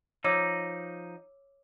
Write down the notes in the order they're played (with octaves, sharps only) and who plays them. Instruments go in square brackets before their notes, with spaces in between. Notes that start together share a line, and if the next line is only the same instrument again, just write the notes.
[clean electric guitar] F3 D#4 [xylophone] C#5 D6 E6